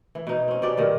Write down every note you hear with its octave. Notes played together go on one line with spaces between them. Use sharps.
E3
B2 D#4
C4 C#4
B2 G4 D5
G2 A#2 D#3